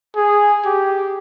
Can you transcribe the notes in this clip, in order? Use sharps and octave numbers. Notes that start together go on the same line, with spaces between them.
G#4
G4